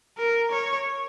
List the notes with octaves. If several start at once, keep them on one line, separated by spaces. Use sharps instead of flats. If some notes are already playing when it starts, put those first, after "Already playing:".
A#4
C#5